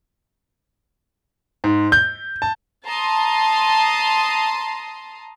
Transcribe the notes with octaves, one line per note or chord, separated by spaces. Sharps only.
G#2
G6
A5
A5 A#5 C6 D#6